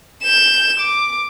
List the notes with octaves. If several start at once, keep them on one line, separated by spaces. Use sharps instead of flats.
G6 E7
D6